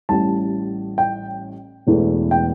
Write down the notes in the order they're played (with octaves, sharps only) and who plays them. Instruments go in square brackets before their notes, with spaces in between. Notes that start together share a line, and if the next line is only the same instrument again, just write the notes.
[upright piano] A1 A2 G3 A5
G5
E1 E2 E3 A3
G5